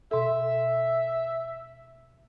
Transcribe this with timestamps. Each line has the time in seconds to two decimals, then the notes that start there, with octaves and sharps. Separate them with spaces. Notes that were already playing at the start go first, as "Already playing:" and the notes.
0.11 B2 A4 E5